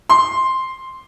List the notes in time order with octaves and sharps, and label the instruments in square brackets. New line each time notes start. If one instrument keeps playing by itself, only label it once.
[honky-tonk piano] C6